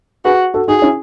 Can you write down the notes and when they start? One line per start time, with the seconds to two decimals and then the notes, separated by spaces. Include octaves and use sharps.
0.25 F#4 G#4 B4
0.54 F#4 A4
0.68 D#4 F#4 G#4
0.82 C#4 E4